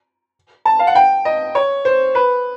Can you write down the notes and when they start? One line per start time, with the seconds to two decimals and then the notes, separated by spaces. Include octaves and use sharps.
0.65 A5
0.79 F5
0.87 F#5
0.95 G5
1.25 D#5
1.55 C#5
1.85 C5
2.15 B4